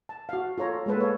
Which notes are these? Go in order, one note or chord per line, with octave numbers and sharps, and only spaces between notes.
A5
F#4 F5
F4 A4 C#5 A#5
G#3 A#3 A4 B4
C#5 F5